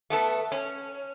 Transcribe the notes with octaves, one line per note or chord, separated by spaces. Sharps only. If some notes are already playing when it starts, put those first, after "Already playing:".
A3 B3 A4
C#4